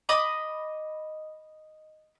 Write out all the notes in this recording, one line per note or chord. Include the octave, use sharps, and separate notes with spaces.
D#5 B5 D6